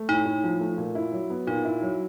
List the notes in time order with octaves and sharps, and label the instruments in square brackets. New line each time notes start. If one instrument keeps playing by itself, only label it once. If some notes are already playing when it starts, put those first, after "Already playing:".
Already playing: [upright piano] A3
[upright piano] A2 [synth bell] D#4
[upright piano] A2
F3
A3
A#2
E4
F#3
B3
[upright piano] A#2 [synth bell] D#4
[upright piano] E4
F#3